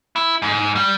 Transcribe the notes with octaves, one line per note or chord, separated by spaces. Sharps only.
E4
G#2
G3